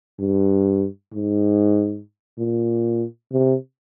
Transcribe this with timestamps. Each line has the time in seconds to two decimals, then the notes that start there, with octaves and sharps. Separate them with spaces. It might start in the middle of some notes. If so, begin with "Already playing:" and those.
0.20 G2
1.13 G#2
2.38 A#2
3.32 C3